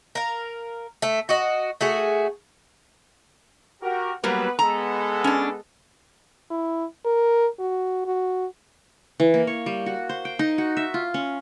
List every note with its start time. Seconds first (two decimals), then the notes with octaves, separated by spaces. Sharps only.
0.15 A#4 F5
1.02 A3
1.29 F#4 D#5
1.81 A3 F#4 G#4
3.81 F#4 G4 A#4
4.24 F#3 G3 A#3 B3 B4
4.59 G#3 B3 A4 A#5
5.24 C#4 D4
6.50 E4
7.05 A#4
7.60 F#4
8.06 F#4
9.20 E3
9.34 A#3
9.47 C#5
9.66 G3
9.86 F#4
10.09 C5
10.25 G5
10.39 D#4
10.58 F#4
10.77 E5
10.94 F4
11.14 C#4